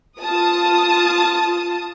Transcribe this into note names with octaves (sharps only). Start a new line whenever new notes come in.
F4 A5 D#6